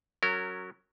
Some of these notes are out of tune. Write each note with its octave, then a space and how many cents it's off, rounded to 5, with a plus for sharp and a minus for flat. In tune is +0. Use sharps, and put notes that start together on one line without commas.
F#3 +0 C#4 +0 A#4 -25